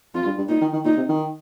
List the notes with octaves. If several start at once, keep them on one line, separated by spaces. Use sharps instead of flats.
F2 F4
G2
G2
A#2 D#4
D#3
D#3
A#2 D#4
C3
D#3